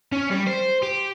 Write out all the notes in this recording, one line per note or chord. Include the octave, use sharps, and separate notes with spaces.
C#4
G3
C5
G4